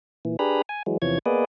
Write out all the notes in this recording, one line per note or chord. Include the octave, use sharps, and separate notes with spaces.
A#2 E3
D4 G4 G#4 B4 A#5 B5
G#5
E3 F#3 G#3
E2 C3 E3 F3 C#5 G#6
A#3 B3 G#4 B4 D5 D#5